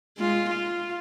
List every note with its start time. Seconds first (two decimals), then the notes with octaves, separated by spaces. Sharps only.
0.18 G#3 F4
0.50 F4